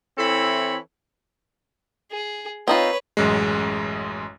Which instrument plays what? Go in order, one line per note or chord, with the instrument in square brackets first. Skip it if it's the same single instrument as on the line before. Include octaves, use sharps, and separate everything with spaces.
[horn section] E3 C4 E4 A4 C#5 B5
[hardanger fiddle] G#4
[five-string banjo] C4 D#4 F4 [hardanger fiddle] B4 C#5
[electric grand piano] A1 F#2 G#3